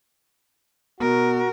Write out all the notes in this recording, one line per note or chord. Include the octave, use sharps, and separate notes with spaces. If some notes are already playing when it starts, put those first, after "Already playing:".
B2 F#4 A#4